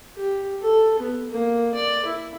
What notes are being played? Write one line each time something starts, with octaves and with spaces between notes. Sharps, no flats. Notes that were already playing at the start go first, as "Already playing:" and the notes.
G4
A4
B3
A#3
D5
E4